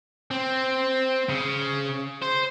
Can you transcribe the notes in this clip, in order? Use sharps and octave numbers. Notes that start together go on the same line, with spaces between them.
C4
C#3
C5